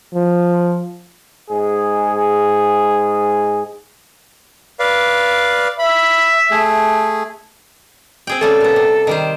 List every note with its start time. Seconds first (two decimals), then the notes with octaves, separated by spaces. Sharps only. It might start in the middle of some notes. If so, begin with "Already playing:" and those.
0.14 F3
1.50 G#2 G#4
4.79 B4 D5 F5
5.79 E5 B5
6.51 A3 G#4
8.27 C4 G#4 G5
8.41 C#3 G3 A3 A4
8.61 A#2 B3
8.76 C3
9.07 D#3 G3 C5